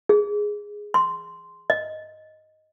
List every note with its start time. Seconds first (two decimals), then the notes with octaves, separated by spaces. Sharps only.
0.09 G#4
0.94 C6
1.70 D#5